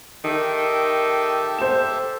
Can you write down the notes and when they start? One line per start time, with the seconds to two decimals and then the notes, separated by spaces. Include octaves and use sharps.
0.24 D#3 G4 A4 E5
1.58 C5 E7